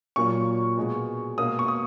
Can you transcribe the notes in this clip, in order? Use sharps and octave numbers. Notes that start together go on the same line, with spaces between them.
A#2 F#3 A#3 C#6
B2 G#3
B2 A#3 D#6
C#6
D#6